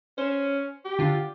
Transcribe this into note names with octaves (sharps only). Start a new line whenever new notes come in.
C#4 C5
G4
D3 F4